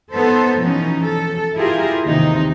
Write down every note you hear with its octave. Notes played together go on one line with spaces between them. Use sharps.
B3 D#4 A4 C5
B2 E3 F3 C#4 D#4
A4
E4 F4 G4 G#4 A#4
D#2 C3 E3 D#4